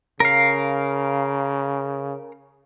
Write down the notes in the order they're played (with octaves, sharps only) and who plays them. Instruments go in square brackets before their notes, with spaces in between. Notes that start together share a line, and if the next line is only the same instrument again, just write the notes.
[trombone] C#3 [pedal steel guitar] A#4 F5